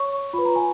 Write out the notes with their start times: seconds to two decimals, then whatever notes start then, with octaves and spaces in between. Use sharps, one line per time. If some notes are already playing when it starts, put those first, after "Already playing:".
Already playing: C#5 C#6
0.33 F4 B4 B5
0.45 A#5
0.56 G#5